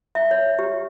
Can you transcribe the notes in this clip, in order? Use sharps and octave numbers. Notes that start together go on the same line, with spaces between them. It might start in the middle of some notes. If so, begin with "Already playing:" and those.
E5
C#5
G4